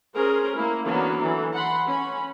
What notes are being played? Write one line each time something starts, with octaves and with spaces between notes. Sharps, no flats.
C#4 G#4 A#4 C5
A#3 E4
D3 E3 F#3 A#3 B3 C#4
E3 A4
F#5 B5 C6
C#4 B5